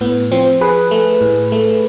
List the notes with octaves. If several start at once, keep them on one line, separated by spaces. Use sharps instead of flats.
A2 B3
F3 C4
F3 G#4 B4
A3
A2
A3